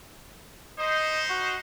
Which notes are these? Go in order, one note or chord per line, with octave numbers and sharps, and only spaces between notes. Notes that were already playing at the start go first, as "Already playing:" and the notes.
D#4 C5 D#5
F#4